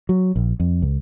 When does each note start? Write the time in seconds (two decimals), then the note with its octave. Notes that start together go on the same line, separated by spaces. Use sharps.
0.09 F#3
0.36 A#1
0.60 F2
0.82 C#2